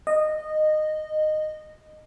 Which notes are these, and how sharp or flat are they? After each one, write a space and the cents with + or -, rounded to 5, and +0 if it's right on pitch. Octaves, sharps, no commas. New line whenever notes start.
D#5 -15